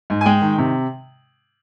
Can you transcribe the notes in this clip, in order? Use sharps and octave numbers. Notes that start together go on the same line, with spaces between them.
G#2
G#5
G#3 G5
D#3
C3